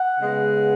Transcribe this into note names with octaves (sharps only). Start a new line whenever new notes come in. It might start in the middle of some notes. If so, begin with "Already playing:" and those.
Already playing: F#5
C#3 G#3 B3